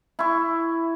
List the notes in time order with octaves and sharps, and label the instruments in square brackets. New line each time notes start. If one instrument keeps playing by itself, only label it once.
[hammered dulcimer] E4 C#6